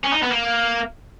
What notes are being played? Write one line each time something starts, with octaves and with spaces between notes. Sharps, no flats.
C#4
D#4
B3
A#3